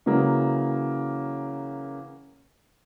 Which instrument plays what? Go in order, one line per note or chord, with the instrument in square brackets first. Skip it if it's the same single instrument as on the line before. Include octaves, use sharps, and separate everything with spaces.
[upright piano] C#3 E3 F#3 A#3